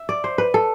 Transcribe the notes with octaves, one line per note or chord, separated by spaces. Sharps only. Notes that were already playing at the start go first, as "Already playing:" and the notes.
Already playing: E5
D5
C5
B4
A4